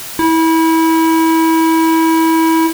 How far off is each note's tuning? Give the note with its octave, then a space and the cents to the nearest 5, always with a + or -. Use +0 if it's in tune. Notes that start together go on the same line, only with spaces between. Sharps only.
E4 -25